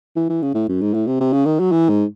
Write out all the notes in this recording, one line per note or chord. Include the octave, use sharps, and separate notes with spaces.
E3
E3
C#3
A2
F#2
G#2
A2
C3
C3
C#3
D#3
F#3
E3
G#2